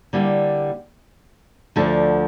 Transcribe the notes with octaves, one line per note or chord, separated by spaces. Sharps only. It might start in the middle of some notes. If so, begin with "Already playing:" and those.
D3 G3 A#3 E4
D2 D3 F3 A3 D4